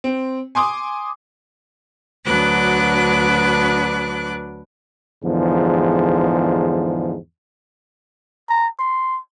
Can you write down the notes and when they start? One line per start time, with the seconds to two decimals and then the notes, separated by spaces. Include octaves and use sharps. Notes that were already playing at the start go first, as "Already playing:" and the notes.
0.04 C4
0.55 G#5 C6 D6 D#6
2.25 D2 F#3 D4 B4 D6 F#6
5.23 E2 G#2 D3 F3
8.50 A#5
8.79 C6